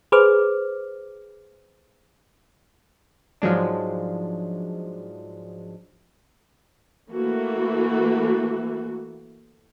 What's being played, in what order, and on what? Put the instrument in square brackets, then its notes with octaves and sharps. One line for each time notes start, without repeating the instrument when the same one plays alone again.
[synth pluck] G#4 B4 C5 D6 F6
[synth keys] G#2 F3 F#3 G#3 D4
[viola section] E3 A3 A#3 F#4